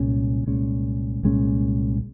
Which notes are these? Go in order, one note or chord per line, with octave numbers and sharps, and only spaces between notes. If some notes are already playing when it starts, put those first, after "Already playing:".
Already playing: C2 A#2 G#3 C#4
C2 A#2 G#3 C#4
C2 A#2 G#3 C#4